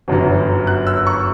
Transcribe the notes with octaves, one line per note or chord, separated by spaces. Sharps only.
G1 F#2 D3 F#3
F#6
E6
C#6